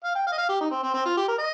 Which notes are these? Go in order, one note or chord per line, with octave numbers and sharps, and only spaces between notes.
F5
G5
F5
D#5
F5
G4
D#4
C4
C4
C4
F4
G4
A#4
D#5